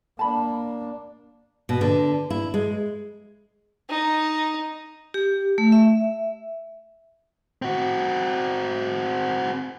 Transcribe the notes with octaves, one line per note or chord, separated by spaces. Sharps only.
A#3 D4 A5 B5
B2
D3
E4
G#3
D#4
G4
A3
E5
C4 F#4